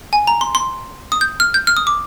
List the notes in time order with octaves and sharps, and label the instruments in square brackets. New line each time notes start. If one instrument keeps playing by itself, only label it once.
[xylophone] G#5
A#5
C6
C6
D#6
G6
F6
G6
F6
D#6
D6